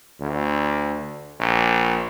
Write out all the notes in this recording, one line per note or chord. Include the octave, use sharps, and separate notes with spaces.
D2
A#1